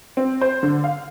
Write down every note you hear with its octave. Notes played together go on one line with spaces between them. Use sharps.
C4
C5
D3
F5